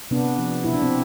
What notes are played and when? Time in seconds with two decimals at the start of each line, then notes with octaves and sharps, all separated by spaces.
0.11 C3 B3 D4
0.38 F3
0.64 B2 E4
0.74 D4
0.82 C4